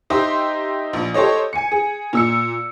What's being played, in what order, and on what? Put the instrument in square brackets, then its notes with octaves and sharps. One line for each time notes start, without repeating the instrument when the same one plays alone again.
[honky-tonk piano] D#4 G4 C5 D#5 E5 C6
A#1
G4 A4 C5 C#5 D#5
G#5 C#7
G#4
A#2 E6 C#7